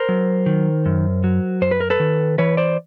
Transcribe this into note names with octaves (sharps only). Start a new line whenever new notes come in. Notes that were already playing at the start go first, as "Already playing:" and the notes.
Already playing: A#4 C5
F#3
D#3
F#2
F#3
F#2 C5
B4
A#4
A4 B4
D#3
E3 B4 C#5
C5 D5